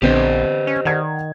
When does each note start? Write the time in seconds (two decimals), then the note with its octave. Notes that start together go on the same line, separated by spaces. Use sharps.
0.02 A#1 D3 B3 C4 G4 C5 D#5
0.67 C#4
0.85 D#3 D5 F#5 G#6